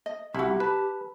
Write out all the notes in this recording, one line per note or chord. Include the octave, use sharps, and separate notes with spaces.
D#5
C2 E4 F#4 G4
B4 A5